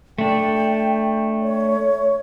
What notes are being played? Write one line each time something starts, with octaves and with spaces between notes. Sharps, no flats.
A3 D4 G5
C#5